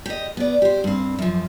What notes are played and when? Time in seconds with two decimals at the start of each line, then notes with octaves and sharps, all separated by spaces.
0.06 G4 D#5
0.37 B3 D5
0.62 G4 C5
0.84 G2 C4
1.19 F#2 F3